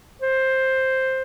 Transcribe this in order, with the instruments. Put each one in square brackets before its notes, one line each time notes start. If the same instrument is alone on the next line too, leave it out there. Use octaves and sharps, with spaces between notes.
[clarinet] C5